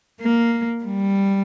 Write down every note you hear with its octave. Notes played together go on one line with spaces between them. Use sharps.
A#3
G3